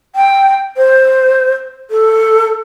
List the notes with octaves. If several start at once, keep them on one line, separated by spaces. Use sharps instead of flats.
G5
C5
A4